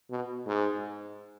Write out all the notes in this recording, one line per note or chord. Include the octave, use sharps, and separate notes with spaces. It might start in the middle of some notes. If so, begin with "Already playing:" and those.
B2
G#2